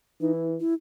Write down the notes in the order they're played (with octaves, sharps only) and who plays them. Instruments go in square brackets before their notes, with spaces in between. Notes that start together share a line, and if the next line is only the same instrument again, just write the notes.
[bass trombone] E3 [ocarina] D#4
[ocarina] E4
E4